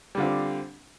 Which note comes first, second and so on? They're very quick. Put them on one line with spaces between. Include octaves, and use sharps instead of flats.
G3 D3 F4 C4